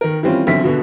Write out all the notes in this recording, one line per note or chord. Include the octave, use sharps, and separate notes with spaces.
D#3 A#4
E3 G3 C4 C#4 F4
B1 D3 C4 E5 B6
B2 D3 B3 F#4